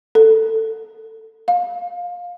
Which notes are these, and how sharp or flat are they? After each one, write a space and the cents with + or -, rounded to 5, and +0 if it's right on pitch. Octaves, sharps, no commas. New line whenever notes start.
A4 +15
F5 +20